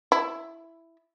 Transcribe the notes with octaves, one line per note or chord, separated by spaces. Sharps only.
E4